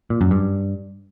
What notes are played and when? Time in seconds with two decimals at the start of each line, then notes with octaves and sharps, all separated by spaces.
0.10 A#2
0.21 F#2
0.31 G2